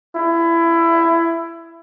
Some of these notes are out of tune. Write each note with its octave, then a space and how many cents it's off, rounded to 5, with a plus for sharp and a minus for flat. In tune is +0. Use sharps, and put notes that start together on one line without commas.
E4 +20